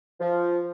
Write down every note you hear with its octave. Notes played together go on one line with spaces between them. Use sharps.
F3